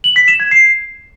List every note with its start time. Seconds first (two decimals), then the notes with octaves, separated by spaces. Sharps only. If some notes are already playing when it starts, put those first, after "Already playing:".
0.04 F#7
0.16 B6
0.28 E7
0.40 G#6
0.51 C7